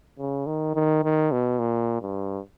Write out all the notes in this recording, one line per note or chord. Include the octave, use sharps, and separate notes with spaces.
C#3
D#3
D#3
D#3
B2
A#2
G2